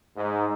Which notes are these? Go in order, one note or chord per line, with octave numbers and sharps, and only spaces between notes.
G#2